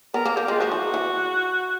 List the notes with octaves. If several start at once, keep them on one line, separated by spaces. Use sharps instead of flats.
B3 A#4
A#3
A#3 G4
G#3 F4
F3 F#4
E3
E3